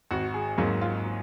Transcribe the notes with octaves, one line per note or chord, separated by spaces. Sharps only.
G#1 F#4
G#4
G#2 F#3 A#3
F4